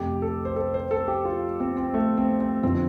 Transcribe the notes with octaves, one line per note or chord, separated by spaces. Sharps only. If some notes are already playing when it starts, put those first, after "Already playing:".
Already playing: F2 C3 A3 G4
A4
C5
A4
C5
A4
G4
F4
C4
C4
A3
C4
C4
F2 D3 F3 A3 C4